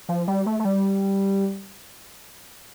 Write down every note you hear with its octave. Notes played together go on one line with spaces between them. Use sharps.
F3
G3
A3
A3
G3